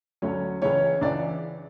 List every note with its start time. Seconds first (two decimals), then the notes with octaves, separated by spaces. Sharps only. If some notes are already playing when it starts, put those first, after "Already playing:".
0.22 D2 D3 F#3 C#4 C#5
0.62 C#2 C#3 E3 C#4 C#5
1.01 C#2 C#3 E3 D4 D5